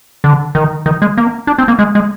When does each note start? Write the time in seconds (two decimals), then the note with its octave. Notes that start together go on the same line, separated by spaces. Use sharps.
0.24 D3
0.55 D#3
0.86 D#3
1.02 G#3
1.18 A#3
1.47 D4
1.58 C4
1.68 A#3
1.79 G#3
1.95 G#3